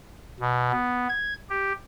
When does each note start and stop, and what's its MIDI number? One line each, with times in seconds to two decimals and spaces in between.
0.40 0.72 47
0.72 1.07 59
1.09 1.34 92
1.50 1.72 67